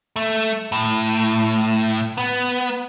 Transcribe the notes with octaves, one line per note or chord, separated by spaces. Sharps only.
A3
A2
B3